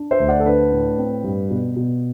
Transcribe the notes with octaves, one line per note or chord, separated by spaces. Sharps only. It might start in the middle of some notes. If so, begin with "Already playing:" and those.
Already playing: D4
C5 E5
D2
D5 F#5
A4
D4 B4
A2
C4
G2
B2
B2